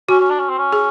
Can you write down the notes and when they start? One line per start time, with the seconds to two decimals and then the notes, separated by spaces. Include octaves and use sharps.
0.09 C#4 F#4
0.20 C#4
0.30 D4
0.40 C#4
0.49 C4
0.58 C#4
0.73 G#4